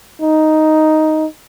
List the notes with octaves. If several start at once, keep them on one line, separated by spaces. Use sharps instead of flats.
D#4